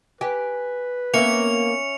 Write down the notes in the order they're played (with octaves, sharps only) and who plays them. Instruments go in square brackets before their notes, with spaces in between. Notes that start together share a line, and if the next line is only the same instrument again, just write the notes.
[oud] G4 [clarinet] B4 [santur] G#5
[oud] A#3 B3 [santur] C#4 C#5 E5 [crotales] C#7 F7